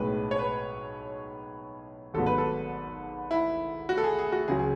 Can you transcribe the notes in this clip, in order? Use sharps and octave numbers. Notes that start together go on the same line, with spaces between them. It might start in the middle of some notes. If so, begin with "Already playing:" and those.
Already playing: B1 A2 G#3 B4
C#5
B4
G#1 G#2 F#3 B3 A4
B4
A4
E4
F#4
A4
G#4
G#4
F#4
C#2 C#3 F#3 G#4
G#4